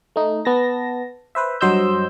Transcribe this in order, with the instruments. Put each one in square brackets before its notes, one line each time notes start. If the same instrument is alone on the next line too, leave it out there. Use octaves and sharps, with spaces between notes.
[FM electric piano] A3 D#4
B3 A5 A#6
B4 C5 E5
G2 F#3 C5 D#5 E6 G6